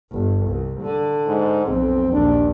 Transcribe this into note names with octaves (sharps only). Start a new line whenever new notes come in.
G1
C2
D3
G#2
B1 F2 C4
A#1 D#2 D4